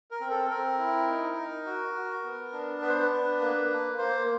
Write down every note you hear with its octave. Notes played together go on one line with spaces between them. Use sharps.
A#4
C4
A4
C4 A#4
E4
D#4
D#4
F#4
F#4
B3
D4
B3 B4
C5
B4
D4
A#3
A#3
A#3 C5